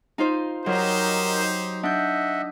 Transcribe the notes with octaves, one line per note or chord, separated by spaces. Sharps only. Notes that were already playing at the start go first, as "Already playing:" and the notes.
D#4 F4 C5
F#3 D#4 G4 A#4 C5 D#5
D4 D#5 E5 F#5 G6